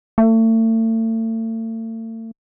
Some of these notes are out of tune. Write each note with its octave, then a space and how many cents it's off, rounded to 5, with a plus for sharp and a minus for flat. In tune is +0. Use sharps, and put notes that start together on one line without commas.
A3 +40